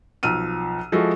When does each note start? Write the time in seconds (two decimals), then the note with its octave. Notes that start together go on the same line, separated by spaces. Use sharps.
0.23 B1 F3 E6 F6 D#7
0.92 F3 G#3 E4 F#4 A4